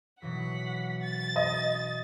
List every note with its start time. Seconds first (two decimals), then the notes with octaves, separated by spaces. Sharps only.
0.22 B2 E3 F#3 F#5 B6
1.01 A6
1.36 D#5